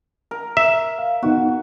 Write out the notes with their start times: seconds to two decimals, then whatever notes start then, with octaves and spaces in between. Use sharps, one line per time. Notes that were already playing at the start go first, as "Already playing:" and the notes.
0.31 A#4
0.57 E5
0.99 F5
1.23 B3 D#4 F#4